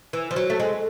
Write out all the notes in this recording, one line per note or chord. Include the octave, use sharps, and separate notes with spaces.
E3
F3
F#3
A3
G#3